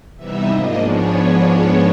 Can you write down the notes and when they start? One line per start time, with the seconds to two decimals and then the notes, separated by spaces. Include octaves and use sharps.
0.16 C3 E3 G3 B3 D#4 E5
0.47 G#2 F3 A#3 D4 D#5
0.79 G#2 F3 G#3 B3 D4 C#5